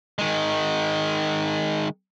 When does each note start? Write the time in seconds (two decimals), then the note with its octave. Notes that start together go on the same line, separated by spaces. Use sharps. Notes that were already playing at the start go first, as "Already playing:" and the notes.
0.19 D#3 G#3